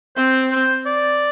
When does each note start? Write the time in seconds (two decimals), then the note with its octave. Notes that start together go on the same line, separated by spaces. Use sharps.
0.16 C4 C5
0.51 C5
0.86 D5